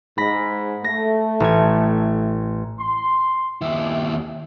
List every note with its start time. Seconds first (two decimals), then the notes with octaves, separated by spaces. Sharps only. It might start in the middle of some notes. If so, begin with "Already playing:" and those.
0.18 G#2 B5 A#6
0.84 A3 A#6
1.40 A1 G#6
2.79 C6
3.62 D#2 E4